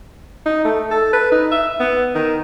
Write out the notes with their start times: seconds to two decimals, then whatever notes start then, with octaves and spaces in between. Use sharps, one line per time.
0.46 D#4
0.65 A3
0.91 A4
1.13 B4
1.32 D#4
1.52 E5
1.80 B3
2.15 D#3